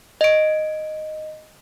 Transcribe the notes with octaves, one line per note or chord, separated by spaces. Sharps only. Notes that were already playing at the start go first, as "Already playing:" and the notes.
D#5 D7